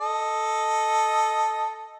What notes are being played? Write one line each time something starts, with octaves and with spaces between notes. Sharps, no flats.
A4 D#5